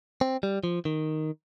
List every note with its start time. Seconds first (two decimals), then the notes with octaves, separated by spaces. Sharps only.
0.21 C4
0.43 G3
0.64 F3
0.85 D#3